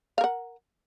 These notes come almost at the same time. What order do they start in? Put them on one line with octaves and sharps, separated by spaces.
F5 A#4 F#5